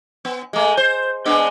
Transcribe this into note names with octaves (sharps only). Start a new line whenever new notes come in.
B3
G#3 A3
C5
G#3 B3 D4